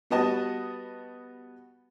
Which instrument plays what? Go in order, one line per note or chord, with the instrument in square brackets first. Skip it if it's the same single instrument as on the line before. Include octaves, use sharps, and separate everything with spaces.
[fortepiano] G3 B3 F#4 D#5 A5